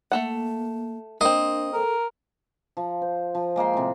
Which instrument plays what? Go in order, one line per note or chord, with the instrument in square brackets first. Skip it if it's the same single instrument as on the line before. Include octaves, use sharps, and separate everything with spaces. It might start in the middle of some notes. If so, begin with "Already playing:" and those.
[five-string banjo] A3 A4 F#5 [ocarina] A#3
[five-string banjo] A#3 C4 [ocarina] D4 [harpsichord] D#5
[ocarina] A4 [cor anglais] A#4
[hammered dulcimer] F3
C5
F3
G#3 A#3 G5 C6
A2 C3